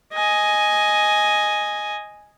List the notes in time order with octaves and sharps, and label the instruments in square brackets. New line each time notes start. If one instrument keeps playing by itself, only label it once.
[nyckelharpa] D#5 G#5